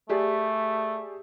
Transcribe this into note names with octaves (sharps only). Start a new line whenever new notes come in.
A3 G4 G#4 D5